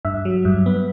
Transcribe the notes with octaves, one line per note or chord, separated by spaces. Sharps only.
G2 E5
F#3
G2
B3